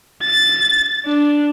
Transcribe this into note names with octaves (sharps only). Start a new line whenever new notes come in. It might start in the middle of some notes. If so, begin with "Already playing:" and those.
A6
D4